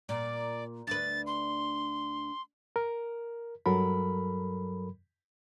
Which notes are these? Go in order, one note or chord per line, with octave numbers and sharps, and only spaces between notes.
A#2 D5
D2 B4 A6
C6
A#4
G2 F#3 A4 A#4 B5